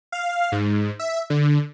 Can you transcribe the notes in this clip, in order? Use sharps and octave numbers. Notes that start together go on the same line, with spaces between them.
F5
G#2
E5
D3